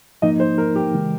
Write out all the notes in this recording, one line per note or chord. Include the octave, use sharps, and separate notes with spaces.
G#2 F3 A#3 D#4 D#5
C5
A#4
G4
C#3 E3 G#3